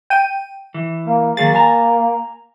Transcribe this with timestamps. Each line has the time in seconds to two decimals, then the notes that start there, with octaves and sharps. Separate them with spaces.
0.10 G5 D#7
0.74 E3
1.06 A#3
1.37 D#3 F#3 A#3 G#4 A6
1.55 G#5 A#5